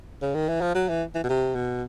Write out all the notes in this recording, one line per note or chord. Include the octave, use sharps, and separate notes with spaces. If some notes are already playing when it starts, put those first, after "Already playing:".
C#3
D#3
E3
F3
F#3
E3
E3
B2
C3
B2